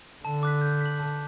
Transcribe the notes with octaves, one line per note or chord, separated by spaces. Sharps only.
D3 A5
D6 F#6 B6
G6
B6 F#7
A5